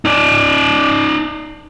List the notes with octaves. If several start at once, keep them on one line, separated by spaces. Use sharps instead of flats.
D#4 D5